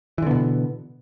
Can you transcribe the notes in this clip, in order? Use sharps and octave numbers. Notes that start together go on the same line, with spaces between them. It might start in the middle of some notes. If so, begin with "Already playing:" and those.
B2 D3 E3 B3